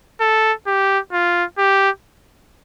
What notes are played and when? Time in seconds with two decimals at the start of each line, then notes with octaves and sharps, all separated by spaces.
0.21 A4
0.67 G4
1.12 F4
1.58 G4